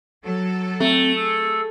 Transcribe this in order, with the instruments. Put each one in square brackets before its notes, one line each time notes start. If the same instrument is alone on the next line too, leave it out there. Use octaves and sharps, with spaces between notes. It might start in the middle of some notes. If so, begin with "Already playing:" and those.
[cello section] F#3 A4
[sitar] A3 [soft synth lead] C4
[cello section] G#4 [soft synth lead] E6